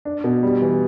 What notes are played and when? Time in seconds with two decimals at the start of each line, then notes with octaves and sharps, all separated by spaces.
0.05 D4
0.24 B2
0.43 G3
0.62 E3